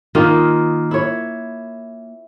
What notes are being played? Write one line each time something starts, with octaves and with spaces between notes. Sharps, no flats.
D#3 A#3 D#4 F4
E4 C#5